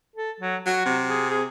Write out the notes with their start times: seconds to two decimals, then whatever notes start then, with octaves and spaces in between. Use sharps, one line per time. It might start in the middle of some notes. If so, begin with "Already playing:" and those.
0.16 A4
0.40 F#3
0.66 F#3 F#4
0.86 C3
1.09 G#4
1.30 G#4